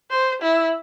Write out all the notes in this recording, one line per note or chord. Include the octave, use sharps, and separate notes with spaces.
C5
E4